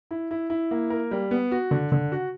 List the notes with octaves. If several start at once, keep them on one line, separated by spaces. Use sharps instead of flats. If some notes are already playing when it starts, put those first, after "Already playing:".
E4
E4
E4
A#3
A#4
G3
B3
F#4
D3
D3
F#4